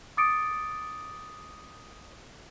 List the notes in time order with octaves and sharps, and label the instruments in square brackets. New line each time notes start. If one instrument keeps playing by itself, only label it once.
[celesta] D6 D#6 A6 C#7 D7